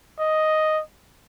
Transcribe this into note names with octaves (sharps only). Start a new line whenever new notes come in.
D#5